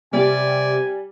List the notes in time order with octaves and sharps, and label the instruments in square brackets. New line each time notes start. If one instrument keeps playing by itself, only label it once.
[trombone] C3 [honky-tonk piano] G3 [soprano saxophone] D5 [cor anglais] G#5